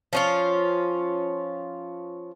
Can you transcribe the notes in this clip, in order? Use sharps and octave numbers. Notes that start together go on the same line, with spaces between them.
F3 C#4 F4